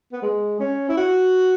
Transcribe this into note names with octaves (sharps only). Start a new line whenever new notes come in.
B3
G#3
C#4
E4
F#4